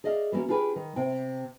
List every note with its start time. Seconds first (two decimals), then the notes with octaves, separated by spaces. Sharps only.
0.04 G#4 D5 D#5 F5
0.32 E3 G3 A#3 C#4 F#4
0.49 D4 F4 G4 G#4 B4
0.76 D#3
0.96 C3 G5